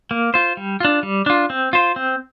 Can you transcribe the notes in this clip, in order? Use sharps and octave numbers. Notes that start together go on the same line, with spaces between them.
A#3
F4 C5
G3
D4 F4
G3
D4 F4
C4
F4 C5
C4